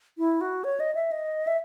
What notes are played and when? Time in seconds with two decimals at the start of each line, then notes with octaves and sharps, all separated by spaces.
0.18 E4
0.41 F#4
0.64 C#5
0.80 D#5
0.95 E5
1.11 D#5
1.47 E5